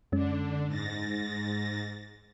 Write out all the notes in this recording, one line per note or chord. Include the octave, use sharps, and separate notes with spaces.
F#2 D3 G#3 C#4 D4
G#2 A6 A#6